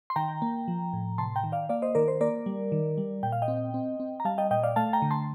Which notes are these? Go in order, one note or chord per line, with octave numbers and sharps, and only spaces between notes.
C6
D#3 G5 A#5
A#3
F3
A2
C3 A5 C6
G5 A#5
D#3
D5 F5
A#3 D5 F5
C5 D#5
D#3 A#4 D5
C5
A#3 A#4 D5
G3
D#3
G3
A#2 G5
F5
D#5 G5
C4
C4
C4
A#5
G3 F5 A5
D#5 G5
A#2 D#5 G5
D5 F5
A3 F5 A5
G5 A#5
D3
A5 C6